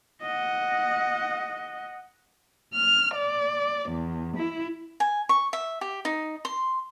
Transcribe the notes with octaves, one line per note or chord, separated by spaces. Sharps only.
D#5 F#5
F6
D5
E2
E4
G#5
C#6
E5
G4
D#4
C6